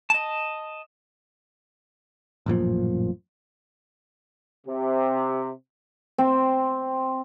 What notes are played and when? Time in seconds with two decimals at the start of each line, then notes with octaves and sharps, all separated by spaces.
0.10 D#5 A5
2.46 A1 F#2 A#2 F3
4.67 C3
6.18 C4